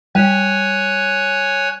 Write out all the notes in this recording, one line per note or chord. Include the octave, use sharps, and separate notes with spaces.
G3 C#5 G#5 F#6